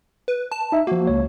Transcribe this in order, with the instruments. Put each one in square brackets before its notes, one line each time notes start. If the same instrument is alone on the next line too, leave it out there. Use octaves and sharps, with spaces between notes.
[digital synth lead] B4
A5
[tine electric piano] D#4 E5
[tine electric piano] F3 F#4 [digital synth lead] A#3
[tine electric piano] C#2 C#5